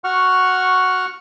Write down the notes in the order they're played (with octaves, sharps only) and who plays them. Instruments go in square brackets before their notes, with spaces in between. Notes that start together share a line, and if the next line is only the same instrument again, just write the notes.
[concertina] F#4 F#5 C#6 F6